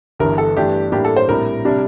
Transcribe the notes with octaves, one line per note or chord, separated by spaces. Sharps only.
G1 G2 E3 A#4
A4
G2 E3 A3 D4 G4
A2 G3 A#3 D4 G4
A4
C5
A#1 A2 G3 C4 A#4
C3 G3 D4